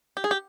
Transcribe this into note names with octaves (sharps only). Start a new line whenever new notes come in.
G4
G#4
G4